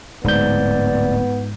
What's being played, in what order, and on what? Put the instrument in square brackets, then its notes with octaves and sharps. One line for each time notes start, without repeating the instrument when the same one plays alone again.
[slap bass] D1 [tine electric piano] G#2 G6 [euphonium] B3 [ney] D5